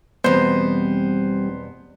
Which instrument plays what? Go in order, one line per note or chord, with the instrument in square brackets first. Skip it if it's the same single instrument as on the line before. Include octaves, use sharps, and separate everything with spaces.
[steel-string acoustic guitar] E2 B2 [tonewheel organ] G3 C4 [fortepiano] B3 C5